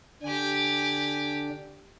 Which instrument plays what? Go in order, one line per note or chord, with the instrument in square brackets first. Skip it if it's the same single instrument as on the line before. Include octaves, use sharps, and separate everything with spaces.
[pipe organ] D3 D4 [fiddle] G4 G#5